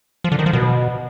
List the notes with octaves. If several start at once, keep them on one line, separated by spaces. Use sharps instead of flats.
F3
D3
D#3
F3
B2